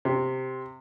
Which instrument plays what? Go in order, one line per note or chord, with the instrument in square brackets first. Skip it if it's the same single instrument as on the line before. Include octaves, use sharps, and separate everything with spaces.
[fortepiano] C3